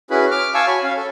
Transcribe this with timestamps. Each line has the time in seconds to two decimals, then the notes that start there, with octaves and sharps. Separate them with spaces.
0.10 C#4 E4 F#4 G#4 B4 B5
0.31 D6 F6
0.54 F5 G#5 A5 C#6 E6
0.67 F#4 C#5 G#5 B5
0.83 C#4 F5
0.97 A4